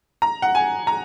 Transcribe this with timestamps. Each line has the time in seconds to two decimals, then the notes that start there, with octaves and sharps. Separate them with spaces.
0.22 A#5
0.42 F#5
0.55 G#5
0.87 A#5